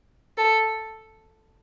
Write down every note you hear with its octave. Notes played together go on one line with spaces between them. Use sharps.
A4